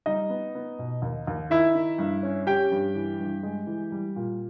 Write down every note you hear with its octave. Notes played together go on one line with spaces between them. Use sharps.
G3 D#4 D#5
B3
B3
B2
D#2
D#2
D#3 E4 E5
D#3
G2
C#4
C#4 G4 G5
G2
E3
G2
G#3
E3
G3
A#2